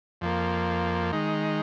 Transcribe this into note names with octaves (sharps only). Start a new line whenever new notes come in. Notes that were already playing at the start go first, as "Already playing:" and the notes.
F2 F3 A#3
D#3 G#3 D#4